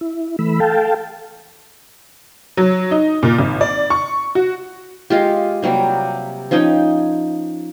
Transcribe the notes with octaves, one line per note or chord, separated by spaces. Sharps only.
E4
E3 A3 B5 E6
A4 F5 G5 A5
F#3
D#4
A#2
G#1
D5
C#6
F#4
G#3 F4 G4
C3 F#3 G3 A#3
F3 C#4 D#4 G5